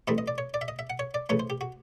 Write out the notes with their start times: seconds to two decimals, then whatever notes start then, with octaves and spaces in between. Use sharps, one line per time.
0.08 G2 E3 A3 C4 E4 D#5
0.18 D#5
0.28 D5
0.38 C#5
0.54 D5
0.61 E5
0.68 D#5
0.79 E5
0.90 F#5
0.99 C#5
1.14 D5
1.29 C#3 E3 A3 C#4 C#5
1.40 C5
1.50 G4
1.61 F#4